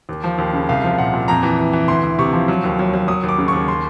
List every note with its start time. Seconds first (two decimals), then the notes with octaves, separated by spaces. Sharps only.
0.09 D#2
0.24 F3
0.38 D#2
0.53 C#3
0.69 C2 F5
0.84 F3
0.98 A#2 F#5
1.13 A#2
1.28 F2 A#5
1.43 E3
1.59 E3
1.73 E3
1.88 D2 C6
2.03 D2
2.19 C3 C#6
2.33 F3
2.48 F#3
2.64 D#2
2.79 F#3
2.94 F#3
3.08 F#3 D#6
3.23 D#2
3.29 D6
3.38 C#3
3.48 D#2 C#6
3.68 C6